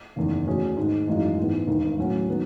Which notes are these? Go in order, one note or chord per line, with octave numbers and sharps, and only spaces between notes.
F#1 E2 D#3
E2 B2 A3 C#4 G#4
G#2 D#3 G#3
G#1 F#2 E3 G#3 D#4
G#1 G#2 E3 B3
E1 D#2 D#3
A2 F#3 C#4 F#4
D#3 F#3 B3